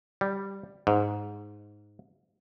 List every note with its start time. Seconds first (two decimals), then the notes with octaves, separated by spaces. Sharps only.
0.21 G3
0.87 G#2